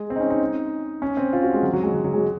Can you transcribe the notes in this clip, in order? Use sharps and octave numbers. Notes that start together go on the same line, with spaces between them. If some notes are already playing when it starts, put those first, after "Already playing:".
Already playing: G#3
C4
D#4
C#4
D#4
C#4
C4
F4
F#4
G#3
F#3
F#3
G#3
F#3
F#3
G#3